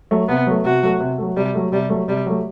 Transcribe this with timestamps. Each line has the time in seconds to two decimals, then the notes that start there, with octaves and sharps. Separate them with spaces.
0.11 F#3 A3
0.28 C3 B3
0.47 F#3 A3
0.64 C3 F#4
0.83 F#3 A3
1.00 C3
1.18 F#3 A3
1.36 C3 G3
1.55 F#3 A3
1.72 C3 G3
1.90 F#3 A3
2.08 C3 G3
2.26 F#3 A3